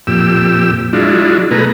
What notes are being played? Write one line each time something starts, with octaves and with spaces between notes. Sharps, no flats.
F2 A#2 G4 E6
F#3 G#3 D4 E4 F4
B2 A3 G#4 B4 A#5